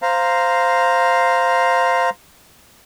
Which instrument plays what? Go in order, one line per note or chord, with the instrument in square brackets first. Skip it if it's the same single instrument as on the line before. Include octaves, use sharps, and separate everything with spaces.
[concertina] C5 F5 A#5